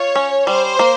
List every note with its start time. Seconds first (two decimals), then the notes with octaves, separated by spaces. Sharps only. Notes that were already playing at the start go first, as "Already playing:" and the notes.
Already playing: F4 C#5
0.16 C#4
0.47 G3 C5
0.79 A#3